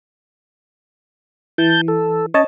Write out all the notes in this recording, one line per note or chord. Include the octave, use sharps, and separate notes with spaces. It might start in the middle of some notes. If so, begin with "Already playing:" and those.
E3 A5 G6
A4
C#4 C#5 D#5 A5